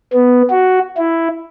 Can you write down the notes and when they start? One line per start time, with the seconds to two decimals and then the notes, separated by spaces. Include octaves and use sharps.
0.13 B3
0.50 F#4
0.98 E4